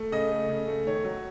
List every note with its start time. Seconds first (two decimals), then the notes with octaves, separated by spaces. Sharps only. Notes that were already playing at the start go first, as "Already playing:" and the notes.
Already playing: A3
0.12 C#3 D#5
0.31 A3
0.49 C#3
0.68 A3
0.86 D#3 C#5
1.04 F#3